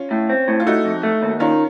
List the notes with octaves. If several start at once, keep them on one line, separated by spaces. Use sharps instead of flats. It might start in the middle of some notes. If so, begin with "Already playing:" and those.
Already playing: C#4 F4
A2
C4
A2
F4
A3 D#4 F#4
F2
A3
D#2
D#3 C#4 F4